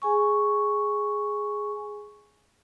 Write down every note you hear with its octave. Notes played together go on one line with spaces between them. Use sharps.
G#4 G#5 C#6